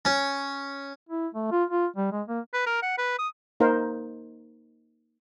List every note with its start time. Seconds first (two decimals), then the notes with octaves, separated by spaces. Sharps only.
0.05 C#4
1.09 E4
1.35 A3
1.52 F4
1.70 F4
1.96 G3
2.12 G#3
2.28 A#3
2.53 B4
2.66 A#4
2.82 F#5
2.98 B4
3.19 D#6
3.60 A#3 D#4 A#4 C5 F5